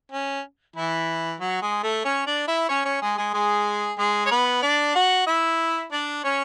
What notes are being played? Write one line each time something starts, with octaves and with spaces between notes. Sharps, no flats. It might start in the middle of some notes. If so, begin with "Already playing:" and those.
C#4
E3 E4
F#3 F#4
G#3 G#4
A3 A4
C#4 C#5
D4 D5
E4 E5
C#4 C#5
C#4 C#5
G#3 G#4
G#3 G#4
G#3 G#4
G#3 G#4
C#5
B3 B4
D4 D5
F#4 F#5
E4 E5
D4 D5
C#4 C#5